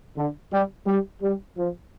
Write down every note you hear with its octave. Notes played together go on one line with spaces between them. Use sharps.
D3
G3
G3
G3
F3